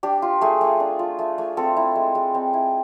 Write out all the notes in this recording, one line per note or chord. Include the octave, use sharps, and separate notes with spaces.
D4 G4
F4
A3 G#4
A3
D4
F4
A3
A3
C4 A4
E4
G#3
G#3
C4
E4